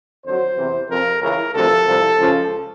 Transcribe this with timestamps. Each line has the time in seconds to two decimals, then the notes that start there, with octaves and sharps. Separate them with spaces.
0.24 F2 D3 F#3 C5
0.57 E2 C3 E3
0.89 F2 C3 F3 A#4
1.21 C#2 C#3 E3 A#4
1.54 D2 C3 F3 A4
1.87 C2 C3 F3
2.19 C#2 C#3 F3